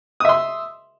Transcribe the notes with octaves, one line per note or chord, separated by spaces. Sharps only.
E5 C6 D#6